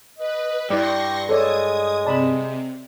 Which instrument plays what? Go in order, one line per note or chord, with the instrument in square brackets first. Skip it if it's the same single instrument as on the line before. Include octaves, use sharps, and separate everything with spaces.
[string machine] B4 [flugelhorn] D#5
[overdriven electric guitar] G2 [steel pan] E4 D5 [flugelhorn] G4 [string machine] C6 C#6 A#6
[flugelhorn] G#3 [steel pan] A4 C#5 D5 [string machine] D#6 G#6
[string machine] C3 [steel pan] D5 A5 B5